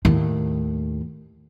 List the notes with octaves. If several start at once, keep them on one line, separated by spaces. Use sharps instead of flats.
D#2 A2